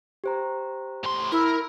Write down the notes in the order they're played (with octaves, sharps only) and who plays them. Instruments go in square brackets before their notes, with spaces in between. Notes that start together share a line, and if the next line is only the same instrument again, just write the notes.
[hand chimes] G4 C5 A#5
[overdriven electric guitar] A2 C6
[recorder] E4 [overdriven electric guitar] A#4